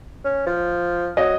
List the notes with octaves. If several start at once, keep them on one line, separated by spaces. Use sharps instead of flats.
C#4
F3
F#3 D#5